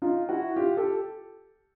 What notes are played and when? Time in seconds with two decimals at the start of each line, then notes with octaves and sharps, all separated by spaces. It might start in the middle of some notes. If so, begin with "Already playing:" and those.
0.02 D#4 F4
0.29 E4 F#4
0.56 F4 G4
0.77 G4 A4